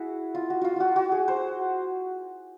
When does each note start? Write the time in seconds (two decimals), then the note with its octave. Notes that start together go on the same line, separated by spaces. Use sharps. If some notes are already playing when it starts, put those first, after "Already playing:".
Already playing: E4 F#4 G#4
0.35 F4
0.50 F#4
0.61 F4 F#4
0.76 F4 F#4
0.96 F#4
1.12 G#4
1.28 C5